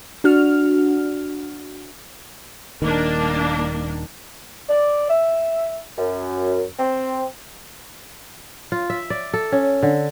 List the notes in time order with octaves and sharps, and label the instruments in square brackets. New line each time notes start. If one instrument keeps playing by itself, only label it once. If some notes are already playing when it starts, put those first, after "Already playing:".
[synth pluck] D4 F#4 F6
[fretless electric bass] D#1 D#3 [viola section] A#3 D4
[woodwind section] D5
E5
F#2
C4
[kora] F4
E5
D5
A4
C#4
D3